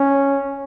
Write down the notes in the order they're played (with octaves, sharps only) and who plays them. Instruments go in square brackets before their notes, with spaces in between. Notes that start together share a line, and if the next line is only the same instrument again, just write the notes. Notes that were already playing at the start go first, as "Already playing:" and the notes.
Already playing: [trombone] C#4